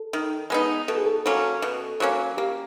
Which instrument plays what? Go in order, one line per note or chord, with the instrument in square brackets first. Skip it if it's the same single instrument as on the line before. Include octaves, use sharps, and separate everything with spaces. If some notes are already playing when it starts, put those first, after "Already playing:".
Already playing: [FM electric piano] A4
[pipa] D#3
G#3 B3 D#4
[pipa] B2 [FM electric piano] A4
[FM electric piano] G#4
A4
[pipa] F#3 A#3 C#4
B2
F#3 A#3 C#4
[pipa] A#3 [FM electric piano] G4